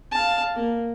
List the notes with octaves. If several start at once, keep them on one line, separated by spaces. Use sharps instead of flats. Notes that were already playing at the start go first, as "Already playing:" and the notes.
F5 A5
A#3